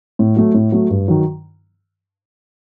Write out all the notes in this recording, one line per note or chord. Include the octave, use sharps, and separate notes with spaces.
A2
F#3 A3
A2
F#3 A3
G2
D#3 F#3